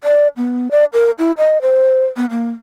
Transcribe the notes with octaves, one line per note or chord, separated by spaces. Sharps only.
D5
B3
D5
A#4
E4
D#5
C5
B3
A#3